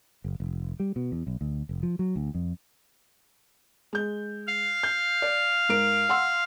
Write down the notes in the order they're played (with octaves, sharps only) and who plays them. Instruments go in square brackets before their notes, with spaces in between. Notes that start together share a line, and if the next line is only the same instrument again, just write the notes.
[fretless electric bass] F#1
F1
G3
B2
E2
B1
D2
F1
F3
F#3
D2
F2
[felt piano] G#3 G6
[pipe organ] F5
[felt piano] G6
D5
G#2 A#4 D7
F#5 C6 E6